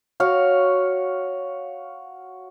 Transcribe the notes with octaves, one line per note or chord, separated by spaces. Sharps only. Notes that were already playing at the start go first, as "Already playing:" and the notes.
F#4 C#5 F5